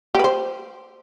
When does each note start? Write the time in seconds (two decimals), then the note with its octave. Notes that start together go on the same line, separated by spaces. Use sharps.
0.15 G4
0.19 B4
0.24 C5